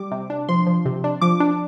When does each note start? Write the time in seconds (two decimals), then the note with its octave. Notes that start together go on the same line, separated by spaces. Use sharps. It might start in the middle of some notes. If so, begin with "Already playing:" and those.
Already playing: G3 D6
0.11 C3
0.30 D4
0.49 F3 C6
0.67 F3
0.85 C3
1.04 D4
1.21 F3 D6
1.40 D4